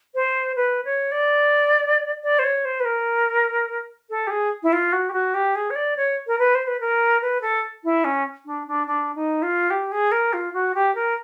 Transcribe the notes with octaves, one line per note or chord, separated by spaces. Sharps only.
C5
B4
C#5
D5
D5
C5
C#5
C5
B4
A#4
A4
G4
G#4
E4
F4
F#4
G4
F#4
G4
G#4
C#5
D5
C#5
A#4
B4
C5
B4
A#4
B4
A4
E4
C#4
D4
D4
D4
D#4
F4
G4
G#4
A#4
F4
F#4
G4
A#4